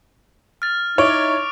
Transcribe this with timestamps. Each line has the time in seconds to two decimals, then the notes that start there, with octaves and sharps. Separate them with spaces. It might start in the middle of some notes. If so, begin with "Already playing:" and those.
0.62 F6 A6
0.98 D#4 E4 C#5 C#6 D6 F6 D7 F7